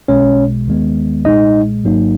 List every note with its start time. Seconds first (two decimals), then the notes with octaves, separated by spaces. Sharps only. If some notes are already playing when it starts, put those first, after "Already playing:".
0.08 B1 B2 G#3 C#4 C#5
0.67 D#2 D#3 G#3 B3
1.25 B1 A#2 G#3 D#4 D#5
1.84 G#1 G#2 F#3 A#3 D#4